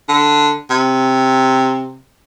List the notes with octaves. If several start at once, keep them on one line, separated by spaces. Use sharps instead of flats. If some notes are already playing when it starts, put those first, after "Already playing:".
D3
C3